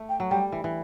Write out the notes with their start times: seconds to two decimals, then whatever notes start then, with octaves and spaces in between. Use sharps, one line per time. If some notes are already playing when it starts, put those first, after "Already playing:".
Already playing: A3
0.09 G5
0.20 F#3
0.31 G3 G5
0.52 E3
0.64 E3